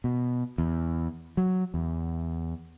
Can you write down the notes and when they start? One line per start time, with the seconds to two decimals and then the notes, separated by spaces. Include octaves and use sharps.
0.04 B2
0.58 E2
1.37 F#3
1.74 E2